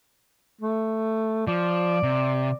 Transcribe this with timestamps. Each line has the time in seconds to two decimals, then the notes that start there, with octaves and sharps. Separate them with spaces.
0.61 A3
1.47 F3 D5
2.03 C3